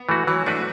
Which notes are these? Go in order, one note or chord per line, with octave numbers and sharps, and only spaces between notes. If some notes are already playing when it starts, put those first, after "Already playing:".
Already playing: B3
E3 A3 F#4
E3 F#3
A3 D4 F#4 B4